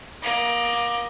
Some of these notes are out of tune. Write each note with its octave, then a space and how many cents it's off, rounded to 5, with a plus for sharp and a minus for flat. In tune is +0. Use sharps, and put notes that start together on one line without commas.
A#3 +25 D#5 +0